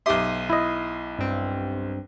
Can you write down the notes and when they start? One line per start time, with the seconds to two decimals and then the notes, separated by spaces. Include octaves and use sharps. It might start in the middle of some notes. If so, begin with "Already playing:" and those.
0.06 B1 D#4 G4 E5 C6 D6 D#6
0.50 E4 D#5
1.19 G2 C4